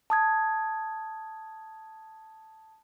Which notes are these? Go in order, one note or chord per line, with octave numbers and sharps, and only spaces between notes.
A5 D#6 G#6